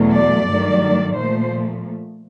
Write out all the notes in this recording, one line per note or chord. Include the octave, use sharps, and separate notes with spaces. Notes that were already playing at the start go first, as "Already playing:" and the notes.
Already playing: E2 B2 F#3 A3
D5
G2 D#3 F#3 A3
A#2 F3 A3 C5